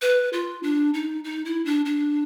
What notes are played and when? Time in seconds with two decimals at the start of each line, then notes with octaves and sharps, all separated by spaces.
0.02 B4
0.33 F4
0.63 D4
0.94 D#4
1.24 D#4
1.45 E4
1.65 D4
1.85 D4